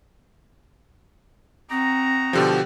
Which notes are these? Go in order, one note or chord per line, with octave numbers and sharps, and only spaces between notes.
C4 D#4 F#4 A#5
B2 D3 F3 G4